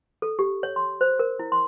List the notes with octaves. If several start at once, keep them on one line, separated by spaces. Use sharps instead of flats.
A4
G4
C#5
C6
C5
A#4
E4
C6